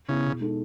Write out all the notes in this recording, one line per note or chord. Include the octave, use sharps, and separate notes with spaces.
C#3 B3 E4 G#4
B2
G#3 D#4 A4